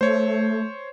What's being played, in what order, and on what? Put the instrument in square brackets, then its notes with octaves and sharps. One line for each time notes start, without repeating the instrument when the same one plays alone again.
[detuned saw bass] A3 [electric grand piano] C5 C#5